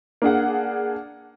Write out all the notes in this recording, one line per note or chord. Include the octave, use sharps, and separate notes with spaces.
A#3 D4 G#4 F#5